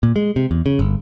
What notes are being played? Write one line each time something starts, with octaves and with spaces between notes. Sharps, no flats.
A#2
G#3
C3
E2
C#3
G1